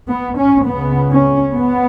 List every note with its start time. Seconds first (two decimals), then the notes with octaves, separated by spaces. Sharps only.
0.09 B3
0.38 C#4
0.66 C#2 C#3 B3
1.10 C#4
1.54 B3